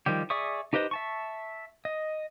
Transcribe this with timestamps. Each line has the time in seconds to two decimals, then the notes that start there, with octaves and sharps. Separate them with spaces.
0.06 D#3 F3 G3 G4
0.30 G#4 D5 E5 C#6 D#6
0.73 D#4 G4 B4 C5 D#5
0.91 E5 A5 C#6
1.85 D#5